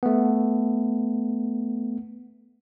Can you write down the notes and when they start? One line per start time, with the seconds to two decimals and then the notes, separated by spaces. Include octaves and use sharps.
0.03 A3 B3